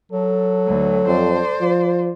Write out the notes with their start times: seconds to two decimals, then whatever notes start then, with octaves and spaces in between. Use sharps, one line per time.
0.12 F#3 A4
0.67 D2
1.07 F2 C5 D5
1.61 F3